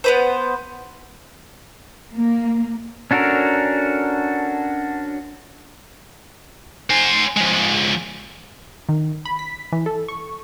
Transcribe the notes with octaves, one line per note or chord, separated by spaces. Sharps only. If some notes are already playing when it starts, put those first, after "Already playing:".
B3 B4 C5
A#3
C#4 D4 F#4 A4 A#4
C5 G#5
F3 G#3
D#3
B5
B6
E3
A4
C#6